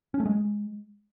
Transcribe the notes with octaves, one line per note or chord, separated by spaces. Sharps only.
C#4
A3
G#3